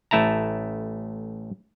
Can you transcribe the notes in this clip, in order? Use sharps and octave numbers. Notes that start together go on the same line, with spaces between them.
A1 A3 E4 A5 A#5